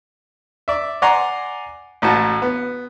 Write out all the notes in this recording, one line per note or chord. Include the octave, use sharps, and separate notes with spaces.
D5 E5
D5 F#5 G#5 A#5 C6
A1 A2 F#4 A5
B3